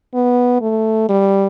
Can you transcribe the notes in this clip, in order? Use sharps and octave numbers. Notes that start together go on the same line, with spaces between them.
B3
A3
G3